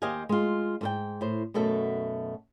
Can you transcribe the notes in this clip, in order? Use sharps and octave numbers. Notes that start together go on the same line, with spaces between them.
D#2 G4 C5 D#5 F5 G#5
G#3 F4
G#2 A4 G5
A2 C5
F#2 B2 A3 F#4 A4